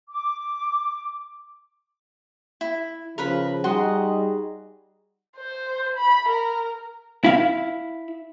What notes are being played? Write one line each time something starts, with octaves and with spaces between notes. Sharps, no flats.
D6
E4
C#3 F3 A#4 B4 B5
G3 D#4 F#4 G#4 D#5 C6
C5
B5
A#4
E4 F5